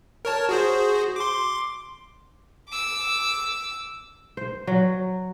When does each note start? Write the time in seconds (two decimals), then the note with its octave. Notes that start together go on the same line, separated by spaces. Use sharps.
0.25 A#4 C#5 A5
0.49 F#4 G#4 C5
1.16 C6 D6
2.69 D6 E6
4.37 C5
4.67 F#3